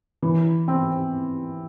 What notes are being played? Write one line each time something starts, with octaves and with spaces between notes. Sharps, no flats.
E3
C4